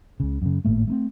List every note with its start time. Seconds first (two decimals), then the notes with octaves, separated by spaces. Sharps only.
0.20 C#2 C#3
0.42 F#2 C#3
0.65 G#1 A2 A3 A#3
0.87 A3 A#3 C4